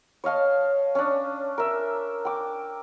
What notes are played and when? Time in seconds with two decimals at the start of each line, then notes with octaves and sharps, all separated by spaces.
0.24 C#5 D#5 F5 A5
0.95 C#4 D4
1.58 A#4 E5
2.25 G5 D6